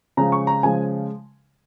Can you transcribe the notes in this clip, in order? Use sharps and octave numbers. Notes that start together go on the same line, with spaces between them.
C#3 F3 G#3 A#5
C#6
A#5
C#3 F3 G#3 G#5